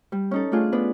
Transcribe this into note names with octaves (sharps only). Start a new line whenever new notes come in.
G3
C#4 D#4 A4
A3 D4 F4 G#4
B3 D4 B4